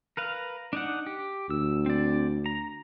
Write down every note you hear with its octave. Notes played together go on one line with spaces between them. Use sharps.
A#4 B4 F5
D4 D#4 F#5
G4
D2 E6
C4 D5
A#5